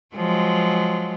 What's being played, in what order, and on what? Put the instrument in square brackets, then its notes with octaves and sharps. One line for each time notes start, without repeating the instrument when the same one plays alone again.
[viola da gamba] F3 F#3 G#3